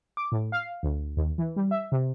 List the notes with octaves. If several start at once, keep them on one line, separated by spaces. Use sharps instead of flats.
D6
A2
F5
D2
D#2
E3
G3
E5
C3